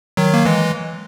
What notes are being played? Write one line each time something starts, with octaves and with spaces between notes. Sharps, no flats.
D#3 F#3
A#3
E3 G#3